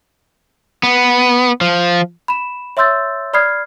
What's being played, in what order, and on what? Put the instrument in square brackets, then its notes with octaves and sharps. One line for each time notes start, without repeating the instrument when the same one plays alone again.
[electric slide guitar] B3
F3
[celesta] B5 E7
C#5 E5 C6 E6 G6 A6
D5 B5 D#6 F6 G#6 C7